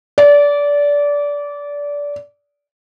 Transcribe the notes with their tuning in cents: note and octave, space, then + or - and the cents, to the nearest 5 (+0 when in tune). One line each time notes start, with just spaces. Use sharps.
D5 -20